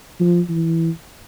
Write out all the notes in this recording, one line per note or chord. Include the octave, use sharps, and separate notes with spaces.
F3
E3